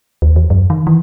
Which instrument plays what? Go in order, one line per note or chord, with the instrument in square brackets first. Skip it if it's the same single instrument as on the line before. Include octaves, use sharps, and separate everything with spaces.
[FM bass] D#2
E2
F#2
D#3
E3